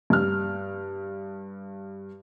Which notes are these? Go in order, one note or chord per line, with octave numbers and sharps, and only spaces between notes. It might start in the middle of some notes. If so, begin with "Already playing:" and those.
G2 F6